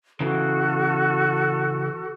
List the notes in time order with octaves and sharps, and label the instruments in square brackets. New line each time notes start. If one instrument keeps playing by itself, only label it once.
[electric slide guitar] C#3 E3 [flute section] F#4 A4